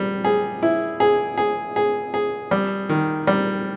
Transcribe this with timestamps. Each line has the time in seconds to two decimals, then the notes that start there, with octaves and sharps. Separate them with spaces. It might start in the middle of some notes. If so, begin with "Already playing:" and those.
Already playing: G3
0.24 G#4
0.63 E4
1.00 G#4
1.38 G#4
1.76 G#4
2.14 G#4
2.51 G3
2.89 D#3
3.27 G3